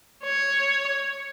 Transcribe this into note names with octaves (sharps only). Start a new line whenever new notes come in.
C#5